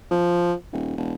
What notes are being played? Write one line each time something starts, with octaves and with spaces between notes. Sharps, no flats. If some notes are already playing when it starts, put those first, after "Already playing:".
F3
D#1
E1